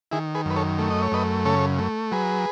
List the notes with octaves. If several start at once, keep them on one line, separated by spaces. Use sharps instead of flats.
D#3 E4 G#4
G#4 B4
F#2 B4
A4 C#5
A3
D#5
C#5
F#2 B4 D#5
C#3 A4 C#5
A3
F#3 G#4 B4